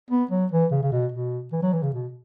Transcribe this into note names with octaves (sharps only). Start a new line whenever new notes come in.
B3
F#3
E3
C#3
C#3
B2
B2
E3
F#3
E3
C#3
B2